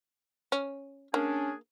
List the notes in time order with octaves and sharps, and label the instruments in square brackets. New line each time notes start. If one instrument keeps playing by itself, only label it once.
[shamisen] C#4
[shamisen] A#3 [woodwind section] C#4 D4 G#4